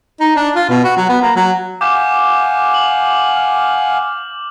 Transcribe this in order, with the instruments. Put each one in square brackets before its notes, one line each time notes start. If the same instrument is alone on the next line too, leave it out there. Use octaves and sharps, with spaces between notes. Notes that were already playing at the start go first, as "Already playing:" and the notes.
[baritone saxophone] D#4
D4
F4
B2
F#4
F#3
B3
A#3
F#3
[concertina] F5 F#5 G#5 [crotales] D6 G6 E7
[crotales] F#7
F6